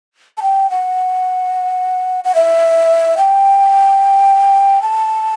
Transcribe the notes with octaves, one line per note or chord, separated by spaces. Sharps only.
A5
G5
F#5
F#5
E5
G5
A5